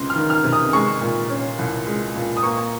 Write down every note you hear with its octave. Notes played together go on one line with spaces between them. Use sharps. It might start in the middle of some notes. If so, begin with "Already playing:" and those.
Already playing: C#2 C3 G#3 C6
F6
D#3
F6
C3
D#6
G#3 C#6
A#2
C#4
C2
G#3
A#2
D#6
A#3 C#6